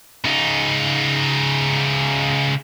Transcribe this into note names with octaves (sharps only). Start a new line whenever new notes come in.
C#3 D#4